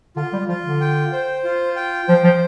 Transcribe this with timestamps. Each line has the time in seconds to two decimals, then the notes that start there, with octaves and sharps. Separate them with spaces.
0.16 D3 F4
0.33 G3
0.48 F3 F4
0.64 D3
0.81 G5
1.13 C5
1.44 F4
1.76 G5
2.08 F3 C5
2.24 F3